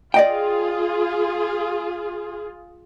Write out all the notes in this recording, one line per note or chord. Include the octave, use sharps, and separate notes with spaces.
F4 G#4 D5 D#5 G5